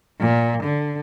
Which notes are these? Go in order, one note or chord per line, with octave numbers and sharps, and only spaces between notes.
A#2
D3